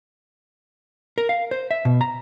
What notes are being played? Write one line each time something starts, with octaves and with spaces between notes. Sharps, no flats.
A#4
F5
C5
E5
B2
A#5